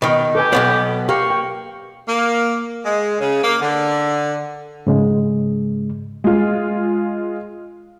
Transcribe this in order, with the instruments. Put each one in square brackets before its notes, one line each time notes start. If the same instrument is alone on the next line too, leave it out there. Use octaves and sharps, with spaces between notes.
[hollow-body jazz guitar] B2 D#3
[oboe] G4 [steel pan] A4 B4 G#5
[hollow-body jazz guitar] B1 B2 B3 [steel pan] C#5 F#5
[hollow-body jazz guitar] A#3 [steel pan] G4 F5 [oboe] C#6
[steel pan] G5
[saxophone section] A#3
G#3
C#3
A#3
D3
[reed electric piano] G#2 C#3 G#3
[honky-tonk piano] G#3 F4